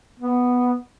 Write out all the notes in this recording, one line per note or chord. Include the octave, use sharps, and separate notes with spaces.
B3